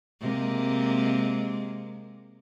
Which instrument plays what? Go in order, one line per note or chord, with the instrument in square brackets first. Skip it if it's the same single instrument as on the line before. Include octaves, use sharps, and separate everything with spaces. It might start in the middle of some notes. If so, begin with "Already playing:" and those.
[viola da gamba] C3 G#3 A#3